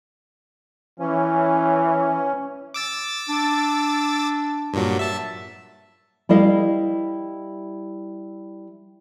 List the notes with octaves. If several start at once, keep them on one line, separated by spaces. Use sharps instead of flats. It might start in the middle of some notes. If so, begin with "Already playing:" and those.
E3 C#4
D6 E6 A6
D4
G2 A#2 F#3
E5 A5 A6
G3 E4 B4 D#5 F5